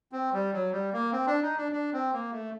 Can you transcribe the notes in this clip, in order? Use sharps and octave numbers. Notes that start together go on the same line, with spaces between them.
C4
G3
F#3
G3
A#3
C4
D4
D#4
D4
D4
C4
A#3
A3